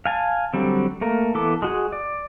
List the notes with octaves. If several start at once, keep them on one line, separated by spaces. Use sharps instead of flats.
F5 G#5 A5
D3 F#3 G3 C4
A3 A#3 A#4
E3 B3 A4 D6
G#3 F#4 G#4
D5